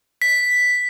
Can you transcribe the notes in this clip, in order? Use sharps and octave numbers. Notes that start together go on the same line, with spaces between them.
B6